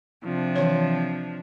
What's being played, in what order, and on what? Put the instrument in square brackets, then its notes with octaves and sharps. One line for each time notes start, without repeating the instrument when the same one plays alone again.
[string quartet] C3 F3 D4
[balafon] E3 C#5